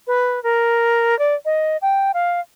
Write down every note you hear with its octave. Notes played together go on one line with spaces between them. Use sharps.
B4
A#4
D5
D#5
G5
F5